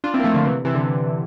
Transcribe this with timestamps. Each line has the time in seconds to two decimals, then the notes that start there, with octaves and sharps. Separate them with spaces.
0.04 D4 F4
0.14 C4 E4
0.19 A#3
0.24 F3 A3
0.34 D3 F3
0.45 C3 E3
0.65 C3 E3
0.75 D3